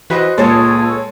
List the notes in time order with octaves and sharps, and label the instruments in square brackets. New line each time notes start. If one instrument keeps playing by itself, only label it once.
[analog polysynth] E3 B4 [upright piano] F#4 C5 D#5
[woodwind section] C#2 G#4 [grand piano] A#2 [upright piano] G#3 A6 [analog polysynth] A4 C#5